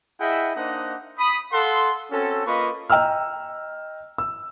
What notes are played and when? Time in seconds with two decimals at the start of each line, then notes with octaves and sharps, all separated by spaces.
0.20 E4 G#4 D#5 E5 F#5 G5
0.56 A#3 D4 D#4 C5 D#5 F#5
1.19 B5 D#6
1.52 A4 F5 F#5 C6
2.11 C4 C#4 F#4 A4
2.46 A#3 F4 B4 D#5 B5 C#6
2.90 D#5 G5 A#5 E6 F6
4.18 E6